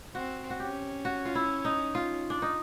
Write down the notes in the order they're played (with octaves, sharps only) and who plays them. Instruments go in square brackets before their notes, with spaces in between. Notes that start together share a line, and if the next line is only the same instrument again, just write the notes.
[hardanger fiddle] C4 [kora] F#4
[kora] F#4
[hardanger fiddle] C#4 [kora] G4
[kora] F#4
F4
E4
D#4
F4
D4
D#4